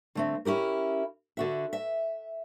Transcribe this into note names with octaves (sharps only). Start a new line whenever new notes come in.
D3 A3 C4
C#4 E4 G4 A#4
D3 F#4 E5
E5